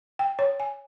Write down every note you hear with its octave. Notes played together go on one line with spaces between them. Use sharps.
G5
C#5
G#5